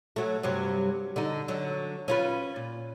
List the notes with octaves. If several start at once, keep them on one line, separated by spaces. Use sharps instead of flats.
F#3 A3
G2 C3 F#3
D3 D#4
D3 F#3
C#4 F4 B4
A#2